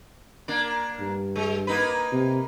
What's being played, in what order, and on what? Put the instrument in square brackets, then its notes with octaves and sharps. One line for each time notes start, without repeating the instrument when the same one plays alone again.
[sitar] A#3 D4
[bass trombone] G2
[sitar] G#3
A#3 D#4 B4
[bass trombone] C3